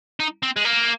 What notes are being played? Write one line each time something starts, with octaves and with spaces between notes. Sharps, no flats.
D#4
C4
G#3
A#3